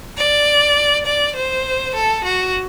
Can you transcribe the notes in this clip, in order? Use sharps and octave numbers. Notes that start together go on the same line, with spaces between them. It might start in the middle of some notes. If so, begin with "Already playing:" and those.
D5
D5
C5
A4
F#4